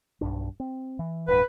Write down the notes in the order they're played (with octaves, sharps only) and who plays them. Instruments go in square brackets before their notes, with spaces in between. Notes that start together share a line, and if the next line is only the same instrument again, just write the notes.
[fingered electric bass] B1 G2 D4
C4
E3
[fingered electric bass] D1 G2 [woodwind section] B4